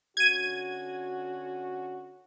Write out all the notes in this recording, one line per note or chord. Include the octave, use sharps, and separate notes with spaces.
D3 C#4 F#4 G#6 D#7